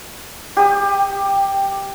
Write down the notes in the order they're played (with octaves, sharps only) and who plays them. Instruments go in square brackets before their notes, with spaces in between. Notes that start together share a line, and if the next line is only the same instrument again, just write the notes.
[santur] G4 D#6